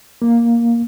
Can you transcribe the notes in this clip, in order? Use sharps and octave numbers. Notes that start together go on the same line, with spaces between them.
A#3